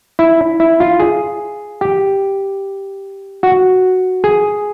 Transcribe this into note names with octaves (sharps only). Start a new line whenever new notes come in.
E4
E4
F4
G#4
G4
F#4
G#4